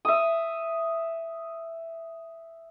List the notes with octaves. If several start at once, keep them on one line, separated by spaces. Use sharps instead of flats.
E5 D#6